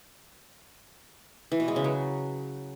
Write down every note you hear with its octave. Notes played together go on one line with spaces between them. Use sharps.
E3
B2
G#3
C#3
F#3